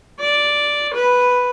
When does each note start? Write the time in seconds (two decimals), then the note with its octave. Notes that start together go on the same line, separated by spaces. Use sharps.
0.20 D5
0.94 B4